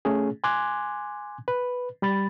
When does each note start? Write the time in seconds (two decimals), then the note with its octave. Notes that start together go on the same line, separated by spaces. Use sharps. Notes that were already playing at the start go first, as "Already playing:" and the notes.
0.05 A3 C#4 G#4
0.44 G#5 C6 D6 F#6 G#6
1.48 B4
2.02 G3 B5 A6